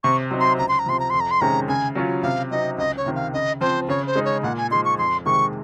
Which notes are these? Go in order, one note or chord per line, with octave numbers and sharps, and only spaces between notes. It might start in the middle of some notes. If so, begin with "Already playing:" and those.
C3 C#6
F#3 C4 D#4
C6
C#2 A#5
C6
A#5
C3 F3 C6
A#5
F2 C6
A#5
C6
C3 D#3 G#3 C#4 A#5
C#3 G#5
F#3 C#4 F4
C3 F5
F#3 C4 D#4 D#5
C#2 D#5
C#5
C3 D#3
F5
C#3 D#5
F3 C4 C5
C#3 C#5
C5
G#3 D#4
C#5
A#2 F#5
G#5
F3 G#3 D#4 C6
C#6
F2 C6
C3 D#3 G#3 C#6